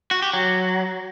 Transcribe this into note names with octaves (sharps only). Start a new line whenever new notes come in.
F#4
G4
F#3